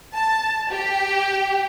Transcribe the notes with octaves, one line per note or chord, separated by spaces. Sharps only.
A5
G4